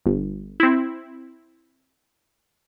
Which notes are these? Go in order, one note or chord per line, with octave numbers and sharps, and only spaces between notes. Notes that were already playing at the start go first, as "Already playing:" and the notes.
G1
C4 E4